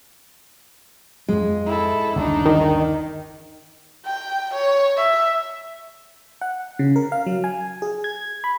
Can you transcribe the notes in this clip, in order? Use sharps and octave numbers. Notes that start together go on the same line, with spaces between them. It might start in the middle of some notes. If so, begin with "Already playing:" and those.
F2 G#2 G#3
E4 A4
G1 D#2 C#3 D4 D#4
D#3
G5
C#5
E5
F#5
C#3
A#4
F5
F#3
G#5
G#4
G#6
B5